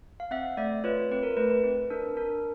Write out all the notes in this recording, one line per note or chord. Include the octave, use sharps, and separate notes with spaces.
F5
C4 E5 F#5
A3 D5 E5
F4 B4 C#5
C4 B4
A#4
A3 B4
B4
C4
D4 A#4
D4 A#4